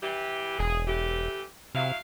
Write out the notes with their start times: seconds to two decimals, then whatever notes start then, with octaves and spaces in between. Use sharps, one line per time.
0.02 E3 E4 G4
0.59 E1 G#4
0.87 E3 A3 G4
1.75 C3 F#3 E4 F5